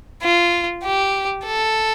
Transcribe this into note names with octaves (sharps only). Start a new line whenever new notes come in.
F4
G4
A4